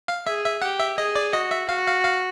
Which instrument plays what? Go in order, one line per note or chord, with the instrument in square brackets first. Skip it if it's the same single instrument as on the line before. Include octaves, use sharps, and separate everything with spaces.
[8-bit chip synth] F5
[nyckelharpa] G#4 [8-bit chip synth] E5
[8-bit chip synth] E5
[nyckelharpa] G4 [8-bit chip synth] F#5
[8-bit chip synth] E5
[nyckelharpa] G#4 [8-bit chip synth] D#5
[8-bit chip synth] D5
[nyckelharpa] F#4 [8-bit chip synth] D#5
[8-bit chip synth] E5
[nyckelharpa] F#4 [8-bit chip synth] F5
[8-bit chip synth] F5
F5